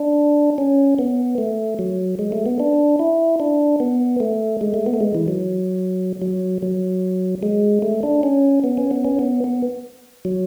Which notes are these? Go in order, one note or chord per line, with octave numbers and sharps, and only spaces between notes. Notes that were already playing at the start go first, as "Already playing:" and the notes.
Already playing: D4
C#4
B3
A3
F#3
G#3
A3
B3
D4
E4
D4
B3
A3
G#3
A3
B3
A3
G#3
E3
F#3
F#3
F#3
G#3
A3
D4
C#4
B3
C#4
B3
C#4
B3
B3
F#3